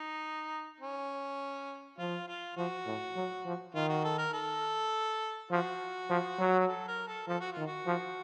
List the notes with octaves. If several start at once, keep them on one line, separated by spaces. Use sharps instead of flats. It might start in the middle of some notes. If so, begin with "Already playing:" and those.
Already playing: D#4
C#4
F3 F4
F4
F3 F#4
A2
F#3
F3
D#3 F4
F#4
A4
A#4
A4
F3 F#4
F3
F#3
F#4
A4
A#4
A4
F3 A4
F#4
D#3 F4
F#4
F3